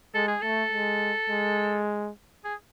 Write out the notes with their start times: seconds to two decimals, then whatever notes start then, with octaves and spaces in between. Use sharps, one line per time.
0.14 G#3 A4
0.28 G#4
0.41 A3 A4
0.72 G#3
1.30 G#3
2.44 G#4